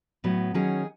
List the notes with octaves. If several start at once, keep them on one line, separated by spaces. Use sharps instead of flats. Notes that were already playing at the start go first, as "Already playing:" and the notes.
A2 F#3 B3
D#3 F#3 C#4 G#4